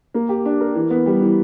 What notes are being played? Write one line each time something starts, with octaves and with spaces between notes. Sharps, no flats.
A#3
G4
D4
A#4
E3
B3
G3
E3